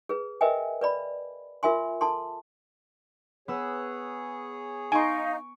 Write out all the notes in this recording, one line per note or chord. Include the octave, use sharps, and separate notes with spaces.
G#4 B4
A#4 B4 D#5 E5 G5 G#5
B4 D5 B5
F4 A#4 E5 G#5 C6
A4 A5 C6
B3 G#4 B4 C#5 E6
D#4 F5 G#5 C6 C#6 D7